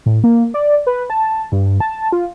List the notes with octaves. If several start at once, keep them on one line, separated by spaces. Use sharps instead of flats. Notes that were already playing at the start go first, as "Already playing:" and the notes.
A2
A#3
D5
B4
A5
G2
A5
F4